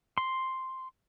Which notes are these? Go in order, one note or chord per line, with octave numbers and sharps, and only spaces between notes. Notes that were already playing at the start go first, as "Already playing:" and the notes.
C6